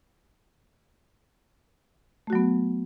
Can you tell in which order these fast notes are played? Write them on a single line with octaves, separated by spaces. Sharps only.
A3 F#4 F#3 B3